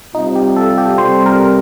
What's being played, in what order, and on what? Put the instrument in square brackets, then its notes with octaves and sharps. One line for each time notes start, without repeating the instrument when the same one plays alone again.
[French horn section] C3 G3 C4 F4 [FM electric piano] D#4
[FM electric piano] G4
A4
G4
[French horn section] C3 G3 C4 [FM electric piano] C5
[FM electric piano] A#4